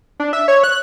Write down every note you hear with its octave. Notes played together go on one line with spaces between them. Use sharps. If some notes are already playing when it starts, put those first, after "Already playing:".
D4
E5
C#5
F#6